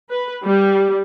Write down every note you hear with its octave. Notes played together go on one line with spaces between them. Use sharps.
B4
G3